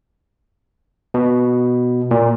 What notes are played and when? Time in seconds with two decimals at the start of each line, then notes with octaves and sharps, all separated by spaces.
1.14 B2
2.11 A#2